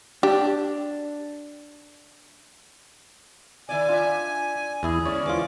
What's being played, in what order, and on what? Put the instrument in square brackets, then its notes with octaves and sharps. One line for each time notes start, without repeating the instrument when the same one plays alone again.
[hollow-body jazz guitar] D4 [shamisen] G4
[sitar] D#3 E4 D5 [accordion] G#5
[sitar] D4 E5 [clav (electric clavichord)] F4
[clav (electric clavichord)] E2 E4 G#5 [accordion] G#4
[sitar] D3 G#3 C#4 [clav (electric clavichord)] C#5 D5
[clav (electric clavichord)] E3 F4 [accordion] F3 D6